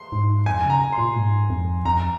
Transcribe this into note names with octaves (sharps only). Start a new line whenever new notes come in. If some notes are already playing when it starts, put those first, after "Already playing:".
Already playing: C6
G#2
F2 G#5
C#3
A#5
C6
A#2
G#2
F2
F2 A#5